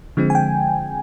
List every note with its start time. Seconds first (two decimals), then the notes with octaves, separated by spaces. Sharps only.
0.17 D3 F3 G#3 C4
0.30 G#5
0.35 G5